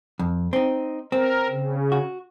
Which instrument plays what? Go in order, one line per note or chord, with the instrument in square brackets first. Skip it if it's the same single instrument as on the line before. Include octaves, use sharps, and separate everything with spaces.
[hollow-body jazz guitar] F2
C4 D#4
[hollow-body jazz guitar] C4 [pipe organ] A#4
[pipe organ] C#3
[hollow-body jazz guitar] F#4